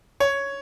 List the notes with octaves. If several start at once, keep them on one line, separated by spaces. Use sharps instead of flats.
C#5